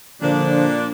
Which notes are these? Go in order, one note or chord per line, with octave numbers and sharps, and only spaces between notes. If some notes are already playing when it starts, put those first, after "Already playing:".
A#2 D3 F3 D4